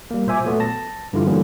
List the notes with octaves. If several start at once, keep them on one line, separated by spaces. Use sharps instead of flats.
G3 A#3
A#2 C5 E5 G#5 D6
A#2 F#3 A3 B3
A5 A#6
G2 D3 E4 F4
D3 E3 F#3 G3 A#3 B3